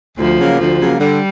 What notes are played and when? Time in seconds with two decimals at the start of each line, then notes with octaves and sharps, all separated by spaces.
0.18 D2 F3
0.39 C#3 F#3 A#3
0.58 D2 F3
0.80 C#3 F#3 A#3
0.99 D3 G3